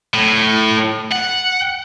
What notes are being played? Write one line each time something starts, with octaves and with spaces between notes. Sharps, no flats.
A2
F#5